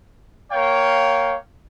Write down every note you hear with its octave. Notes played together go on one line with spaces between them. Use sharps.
A#3 C#5 F5 G5